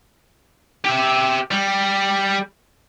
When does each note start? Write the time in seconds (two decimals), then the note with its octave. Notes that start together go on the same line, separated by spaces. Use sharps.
0.85 G4 E5
1.51 G3